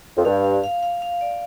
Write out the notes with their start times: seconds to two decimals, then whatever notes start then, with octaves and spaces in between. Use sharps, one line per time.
0.17 F2
0.25 G2 F5
0.44 F5
0.64 F5
0.83 F5
1.02 F5
1.21 D5